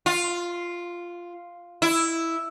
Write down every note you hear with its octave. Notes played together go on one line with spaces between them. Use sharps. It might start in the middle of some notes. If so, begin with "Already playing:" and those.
F4
E4